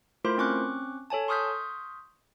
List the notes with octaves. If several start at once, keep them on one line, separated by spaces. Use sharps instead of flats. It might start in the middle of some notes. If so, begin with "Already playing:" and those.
A3 E4 F4 A#4 C5 C6
C4 C#4 C#6 D6 F#6
A4 C#5 G#5 A5
C6 C#6 D#6 F6 G6 B6